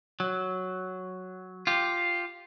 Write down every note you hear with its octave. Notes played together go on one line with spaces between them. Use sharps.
F#3
F4 G4